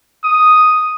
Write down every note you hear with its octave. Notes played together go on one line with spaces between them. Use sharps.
D#6